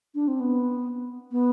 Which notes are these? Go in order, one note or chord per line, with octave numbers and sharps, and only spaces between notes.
D4
C4
B3
B3